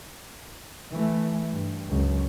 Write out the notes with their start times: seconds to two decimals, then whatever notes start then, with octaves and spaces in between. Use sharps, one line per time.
0.92 E3 A3
1.51 G2
1.89 C#2 F#2